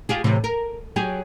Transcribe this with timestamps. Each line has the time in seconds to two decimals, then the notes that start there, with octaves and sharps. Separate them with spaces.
0.09 F4 G4 G#4
0.24 A2 C3 E3
0.44 A#4
0.96 F#3 G4 G#4